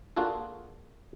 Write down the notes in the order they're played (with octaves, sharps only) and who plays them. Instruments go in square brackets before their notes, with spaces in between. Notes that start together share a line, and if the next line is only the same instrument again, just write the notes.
[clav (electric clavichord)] A#3 D4 F4 F#4 G#4 A4